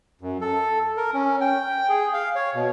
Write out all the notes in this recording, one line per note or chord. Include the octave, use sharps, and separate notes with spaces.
F#2
A4
A#4
C#4
G5
G#4
F5
C#5
B2